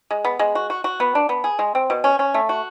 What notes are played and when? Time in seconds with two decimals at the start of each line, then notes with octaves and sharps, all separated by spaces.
0.11 G#3
0.25 B3
0.39 G#3
0.55 F#4
0.70 F#4
0.84 F#4
1.00 B3
1.15 D4
1.29 B3
1.44 G#4
1.59 G#3
1.75 C4
1.90 B2
2.04 C#4
2.19 C#4
2.34 A3
2.49 F#4